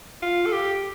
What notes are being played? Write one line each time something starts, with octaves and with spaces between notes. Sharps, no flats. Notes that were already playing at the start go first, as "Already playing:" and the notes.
F4
A4
G4